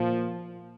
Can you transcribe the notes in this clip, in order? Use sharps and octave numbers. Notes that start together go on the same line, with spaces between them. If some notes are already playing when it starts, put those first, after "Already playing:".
Already playing: A#2 F3